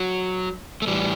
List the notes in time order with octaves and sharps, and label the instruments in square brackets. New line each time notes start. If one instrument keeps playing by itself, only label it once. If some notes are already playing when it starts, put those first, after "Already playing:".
Already playing: [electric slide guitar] F#3
A3
A2 E3 G3